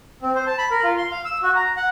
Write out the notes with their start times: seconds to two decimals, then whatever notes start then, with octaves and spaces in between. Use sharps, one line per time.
0.22 C4
0.35 C5
0.47 A5
0.58 B5
0.71 A#4
0.84 F4
0.98 C6
1.11 F5
1.25 E6
1.43 F#4
1.56 A#5
1.77 F#5